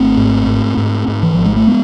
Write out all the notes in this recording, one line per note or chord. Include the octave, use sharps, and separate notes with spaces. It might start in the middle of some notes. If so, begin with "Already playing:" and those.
Already playing: G#1 A3 C4
G#2
G#2
G#2
G#2
E3
G#1 F3
G#3
A3
G#3 B3